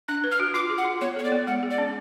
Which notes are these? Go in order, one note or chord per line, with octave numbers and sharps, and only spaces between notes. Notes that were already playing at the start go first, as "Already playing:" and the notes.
D4 F#6
B4
F6
F#4
F4 D6
G#4
F#5
F4
B3 C#5
A4 C#5
D5
B3
G#3 F#5
G#4
D5
C#4